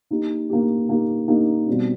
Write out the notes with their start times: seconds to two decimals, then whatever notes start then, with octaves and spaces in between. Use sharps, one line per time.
0.11 A#3 D#4 G4
0.49 A#3 D#4 G4
0.89 A#3 D#4 G4
1.28 A#3 D#4 G4
1.68 B2 G3 C4